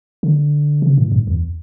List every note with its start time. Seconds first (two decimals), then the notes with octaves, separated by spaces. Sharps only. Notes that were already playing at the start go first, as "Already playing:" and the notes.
0.23 D3
0.82 C#3
0.98 A2
1.12 G2
1.27 E2